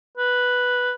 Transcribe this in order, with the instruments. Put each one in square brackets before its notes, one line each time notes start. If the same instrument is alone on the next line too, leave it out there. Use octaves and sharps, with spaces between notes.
[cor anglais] B4